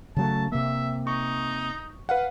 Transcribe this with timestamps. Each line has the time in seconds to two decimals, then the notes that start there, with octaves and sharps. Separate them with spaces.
0.17 C#3 F#3 A3 A5
0.52 C3 A#3 E5
1.07 D#4 C#6
2.09 B4 F5 F#5